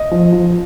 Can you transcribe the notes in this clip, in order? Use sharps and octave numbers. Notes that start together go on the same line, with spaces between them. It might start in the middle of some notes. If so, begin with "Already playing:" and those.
Already playing: D#5
F3
F3